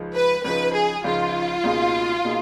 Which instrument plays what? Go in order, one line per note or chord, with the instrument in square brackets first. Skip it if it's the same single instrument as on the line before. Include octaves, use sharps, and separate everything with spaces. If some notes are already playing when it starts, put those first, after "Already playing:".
Already playing: [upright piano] C#2 C#3 F3 G#3 D#4
[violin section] B4
[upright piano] C#2 C#3 F3 G#3 D#4 [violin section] B4
[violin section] G#4
[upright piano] C#2 C#3 F3 G#3 D#4 [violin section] F4
[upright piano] C#2 B2 A#3 D#4 G#4
B2 A#3 D#4 G#4